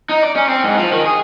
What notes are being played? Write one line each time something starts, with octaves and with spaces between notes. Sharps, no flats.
D#4
D5
C#4
C4
G#2
F3
D#3
G#4